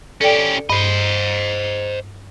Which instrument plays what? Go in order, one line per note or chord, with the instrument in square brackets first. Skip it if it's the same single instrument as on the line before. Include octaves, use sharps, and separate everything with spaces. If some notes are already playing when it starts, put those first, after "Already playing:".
[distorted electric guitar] C#4 G4 [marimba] A4 D5 G5
[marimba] G2 [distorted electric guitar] C5 D#5